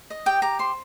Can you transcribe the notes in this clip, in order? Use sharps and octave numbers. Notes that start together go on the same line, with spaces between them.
D#5
G4 G5
G4 A#5
C5 C6